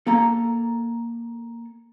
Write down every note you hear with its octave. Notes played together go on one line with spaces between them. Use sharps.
A#3 A4 A#5